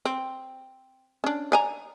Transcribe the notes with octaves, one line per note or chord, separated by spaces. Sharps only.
C4
C#4 D4
D5 G#5 A#5